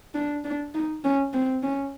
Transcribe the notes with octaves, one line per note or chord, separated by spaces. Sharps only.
D4
D4
D#4
C#4
C4
C#4